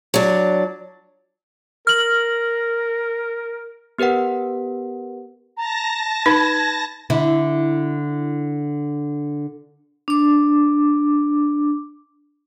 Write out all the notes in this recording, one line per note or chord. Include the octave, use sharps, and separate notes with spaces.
F#3 D4
A#4 F6 F#7
B3 G4 A#4 B4 F#5
A5 A#5 A#6
D#4 B4 G#6
D3 E4
D4 D6